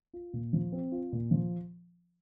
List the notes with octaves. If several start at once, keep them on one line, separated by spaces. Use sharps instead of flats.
F4
A#2
F3
C4
F4
A#2
F3